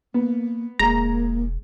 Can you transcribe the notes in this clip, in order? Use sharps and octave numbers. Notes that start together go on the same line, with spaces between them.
A#3 B3
E1 G#3 A#3 A#5